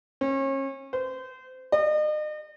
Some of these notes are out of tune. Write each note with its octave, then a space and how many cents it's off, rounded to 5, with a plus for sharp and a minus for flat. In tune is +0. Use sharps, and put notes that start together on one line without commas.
C#4 -35
C5 -30
D#5 -40